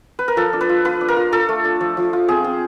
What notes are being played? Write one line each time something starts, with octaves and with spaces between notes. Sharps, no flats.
B4
A#4
F3 A4
D4
B4
F4
F4 B4
D4
A#4
F4
F4 A4
A3
D4
F3
F3
F4
C4 G#4
C4